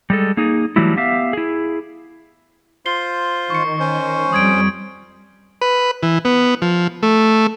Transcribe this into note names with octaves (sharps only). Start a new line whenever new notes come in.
G3 G#3 A4
A#3 D#4 G#4
E3 F#3 G3 A3 E4
B3 G4 E5 F5
E4 G#4
F4 C5 C7 G7
D#3 C#6 C#7
C#4 C5
F2 G3 D#6 G#6 D7
B4
E3
B3
F3
A3